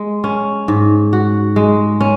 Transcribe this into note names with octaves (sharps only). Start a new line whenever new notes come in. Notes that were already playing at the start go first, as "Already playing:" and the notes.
Already playing: G#3
C#4
G#2
F#4
G#3
C#4